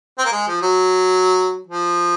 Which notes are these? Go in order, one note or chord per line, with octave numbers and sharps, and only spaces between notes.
C4
A#3
G#3
F3
F#3
F3